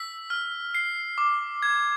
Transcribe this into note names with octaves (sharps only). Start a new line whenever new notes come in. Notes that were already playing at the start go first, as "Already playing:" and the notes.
Already playing: E6 B6
F6
C7
D6
G#6